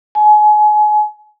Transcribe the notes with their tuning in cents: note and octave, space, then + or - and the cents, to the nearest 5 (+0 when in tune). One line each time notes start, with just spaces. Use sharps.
G#5 +30